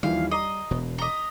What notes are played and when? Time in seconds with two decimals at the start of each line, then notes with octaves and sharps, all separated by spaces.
0.03 D#2 E3 F3 G3 F5
0.31 D#5 A#5 C7
0.71 E1 B2
0.98 D#5 A#5 B6 G7